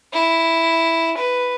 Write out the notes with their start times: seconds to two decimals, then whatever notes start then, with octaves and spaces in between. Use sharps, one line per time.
0.14 E4
1.18 B4